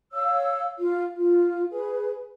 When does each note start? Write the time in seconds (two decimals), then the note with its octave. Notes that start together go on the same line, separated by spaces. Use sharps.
0.13 C#5 F5 E6
0.79 F4
1.15 F4
1.71 G#4 B4